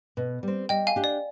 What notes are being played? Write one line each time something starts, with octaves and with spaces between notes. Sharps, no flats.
B2
G3 C4
G3 D#5 G5
F5 G#5
D4 G4
D5